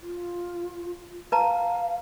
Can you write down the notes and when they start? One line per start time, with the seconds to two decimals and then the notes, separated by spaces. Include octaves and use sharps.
0.01 F4
1.32 B4 F5 A5 A#5